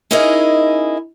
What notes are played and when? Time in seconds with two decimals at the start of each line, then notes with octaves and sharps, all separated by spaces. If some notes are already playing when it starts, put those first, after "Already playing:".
0.11 C#4 D#4 E4 G#4 A#4 D#5